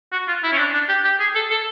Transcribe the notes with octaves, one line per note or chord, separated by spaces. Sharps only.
F#4
F4
E4
C#4
D4
D4
G4
G4
G#4
A4
A4